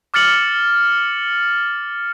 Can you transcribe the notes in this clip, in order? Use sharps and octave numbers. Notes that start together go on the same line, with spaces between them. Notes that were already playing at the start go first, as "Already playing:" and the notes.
D6 F6 A6 C#7 F#7